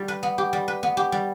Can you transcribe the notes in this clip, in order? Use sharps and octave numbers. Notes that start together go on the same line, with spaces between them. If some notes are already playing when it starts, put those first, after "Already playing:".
Already playing: G3 G4
B4
B3
G4
G3
B4
B3
G4
G3